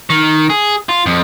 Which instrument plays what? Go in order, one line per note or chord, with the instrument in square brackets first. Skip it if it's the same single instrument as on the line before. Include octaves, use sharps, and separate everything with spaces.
[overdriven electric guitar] D#3
G#4
F4
F2